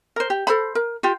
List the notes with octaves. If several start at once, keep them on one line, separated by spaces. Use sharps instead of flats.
A#4 C5
G4
A4 C5 B5
A#4
F4 G4